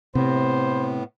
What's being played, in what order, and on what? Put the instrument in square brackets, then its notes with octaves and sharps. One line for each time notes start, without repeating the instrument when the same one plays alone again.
[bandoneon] A2 B3 [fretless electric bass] C3 [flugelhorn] C5